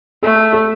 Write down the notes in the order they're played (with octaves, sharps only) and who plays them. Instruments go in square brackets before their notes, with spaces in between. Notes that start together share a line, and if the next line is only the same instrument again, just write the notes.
[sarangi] A3 [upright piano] A4
[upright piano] A4